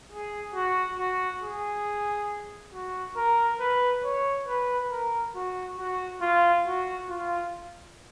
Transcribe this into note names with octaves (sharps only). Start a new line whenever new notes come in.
G#4
F#4
F#4
G#4
F#4
A#4
B4
C#5
B4
A#4
F#4
F#4
F4
F#4
F4